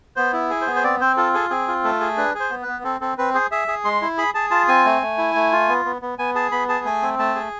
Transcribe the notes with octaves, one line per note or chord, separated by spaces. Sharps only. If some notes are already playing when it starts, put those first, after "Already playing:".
B3 C5
E4
G#4
C5
B3
C5
C4 D5
C4 C5
F4 A4
G#4 A4
C4 G#4
F4
A3 A4
G#4
D4 B4
G#4
C5
B3
B4
B3
C4 A4
C4 A4
C4 B4
G#4 C5
G#4 E5
G#4
G#3 C6
E4
G#4 B5
G#4 A5
F4 A5
C4 G#5
A3
A3
E4
A3
F4
B3
B3
B3
B3 G#5
G#4 A5
B3 B5
G#4 A5
A3 G#5
C4
A3 A5
G#4